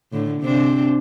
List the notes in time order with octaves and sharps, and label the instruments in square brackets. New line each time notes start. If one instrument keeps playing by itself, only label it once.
[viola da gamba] A2 D3
C3 C4 D4